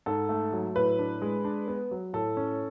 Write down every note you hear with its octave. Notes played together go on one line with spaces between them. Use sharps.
G#2 A4
A3
F#3
A2 B4
D4
G#3
D4
B3
F#3
A2 A4
C#4